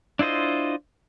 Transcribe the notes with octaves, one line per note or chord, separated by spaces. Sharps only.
D4 E4 F4 C5 D#5